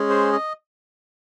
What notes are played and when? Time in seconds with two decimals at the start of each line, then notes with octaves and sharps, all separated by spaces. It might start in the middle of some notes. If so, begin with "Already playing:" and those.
Already playing: G#3 C#4 G#4
0.10 C5
0.33 D#5